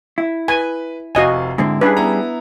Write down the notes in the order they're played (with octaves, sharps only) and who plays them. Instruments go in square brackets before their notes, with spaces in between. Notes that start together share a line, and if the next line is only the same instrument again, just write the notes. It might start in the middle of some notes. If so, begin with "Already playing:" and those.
[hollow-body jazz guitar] E4
[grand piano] B4 [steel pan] G#5
[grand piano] F1 C3 F5 [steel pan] F#4 D#5 G#5
[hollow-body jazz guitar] G#2 D3 C4 [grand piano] E4
[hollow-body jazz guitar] G3 C#4 G#4 [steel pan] D4 B4
[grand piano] B3 E4 A#5